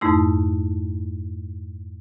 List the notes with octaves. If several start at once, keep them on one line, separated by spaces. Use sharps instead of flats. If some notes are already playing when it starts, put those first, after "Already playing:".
F2 G#2 A3 D#4 E4